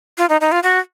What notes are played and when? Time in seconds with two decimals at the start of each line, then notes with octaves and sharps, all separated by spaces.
0.18 F4
0.29 D#4
0.41 D#4
0.52 F4
0.63 F#4